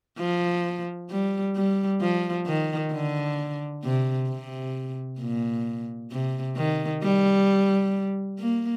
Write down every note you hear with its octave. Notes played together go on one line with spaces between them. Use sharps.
F3
G3
G3
F3
D#3
D3
C3
C3
A#2
C3
D#3
G3
A#3